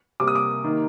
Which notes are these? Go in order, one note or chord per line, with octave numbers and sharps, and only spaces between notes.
C3 G3 A#3 D6
D#6
D6
D#3 A#3